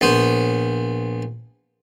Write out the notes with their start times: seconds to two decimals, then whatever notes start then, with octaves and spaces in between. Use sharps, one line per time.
0.01 A#1 B3 C5